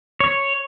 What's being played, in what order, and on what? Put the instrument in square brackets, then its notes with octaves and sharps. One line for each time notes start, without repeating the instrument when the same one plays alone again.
[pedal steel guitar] C#5